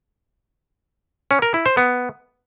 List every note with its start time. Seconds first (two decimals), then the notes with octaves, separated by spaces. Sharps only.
1.31 C#4
1.42 A#4
1.54 E4
1.66 C5
1.77 B3